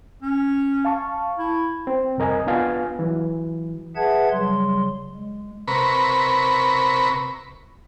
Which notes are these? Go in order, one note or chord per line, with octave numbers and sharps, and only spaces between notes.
C#4
F5 A5 C#6
E4
C4
C2 F2 A#4 D#5 G#5
B3 D4 F4 F5 G#5
E3 F#3
G#4 B4 E5 F#5 A5 G#6
C#3 F#3 G3 C6
G#3
C3 A#4 B4 B5 C#6